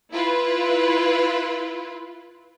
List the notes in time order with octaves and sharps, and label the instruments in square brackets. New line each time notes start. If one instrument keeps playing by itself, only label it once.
[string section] E4 F4 B4